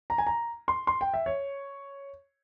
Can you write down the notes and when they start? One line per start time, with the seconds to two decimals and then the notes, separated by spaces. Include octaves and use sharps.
0.10 A#5
0.18 G#5
0.27 A#5
0.68 C6
0.87 C6
1.01 G5
1.14 E5
1.26 C#5